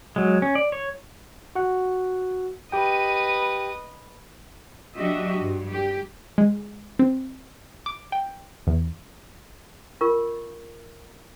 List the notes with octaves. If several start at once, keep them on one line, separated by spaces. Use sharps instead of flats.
F#3 G#3
C#4
D5
C#5
F#4 F#5
G4 B4 D#5 G5
F#3 D4 F#4 G4 D#5 E5
G2
G4
G#3
C4
D6
G5
E2
F4 A#4 C#6